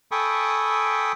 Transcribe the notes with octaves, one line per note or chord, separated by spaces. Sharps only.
A4 G5 G#5 B5 C#6 D#6